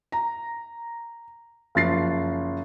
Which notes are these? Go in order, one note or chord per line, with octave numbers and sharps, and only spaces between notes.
A#5
F#1 F3 A6 C7